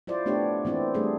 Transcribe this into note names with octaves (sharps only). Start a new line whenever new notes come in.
E4 F4 C5 D5
A3 B3 D4 G4 C#5 D5
E3 A#3 C4 E4 D5
G3 A3 D4 G#4